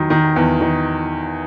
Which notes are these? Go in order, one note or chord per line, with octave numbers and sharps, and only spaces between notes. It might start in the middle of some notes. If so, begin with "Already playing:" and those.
Already playing: E2 D#3 F#3
D#3
E2
D#3